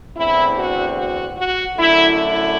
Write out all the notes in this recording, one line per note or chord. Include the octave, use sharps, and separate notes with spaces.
E2 D3 A3 C4 E4
F#4
F#4
F#4
F#2 D3 A3 E4
E4